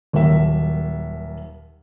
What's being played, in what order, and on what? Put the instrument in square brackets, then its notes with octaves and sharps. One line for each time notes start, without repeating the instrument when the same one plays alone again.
[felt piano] D#1 D#2 F#3 A#4 E5